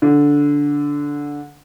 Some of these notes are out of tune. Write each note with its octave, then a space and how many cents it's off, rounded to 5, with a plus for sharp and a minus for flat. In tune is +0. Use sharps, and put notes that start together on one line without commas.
D3 -10